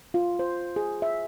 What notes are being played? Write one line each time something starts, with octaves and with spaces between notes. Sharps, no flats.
F4
C5
G#4
E5